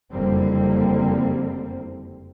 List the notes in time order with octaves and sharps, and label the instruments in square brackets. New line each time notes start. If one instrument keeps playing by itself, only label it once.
[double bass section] F#1 F2 D3 G3 A#3 C4